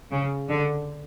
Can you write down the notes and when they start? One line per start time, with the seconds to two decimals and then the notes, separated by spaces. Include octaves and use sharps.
0.11 C#3
0.49 D3